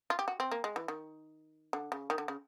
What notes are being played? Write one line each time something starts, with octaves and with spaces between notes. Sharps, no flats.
F4
G4
F#4
C4
A#3
G#3
E3
D#3
D3
C#3
D#3
D3
C#3